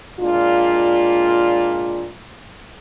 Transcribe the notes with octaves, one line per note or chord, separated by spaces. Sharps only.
A#2 G#3 D4 F4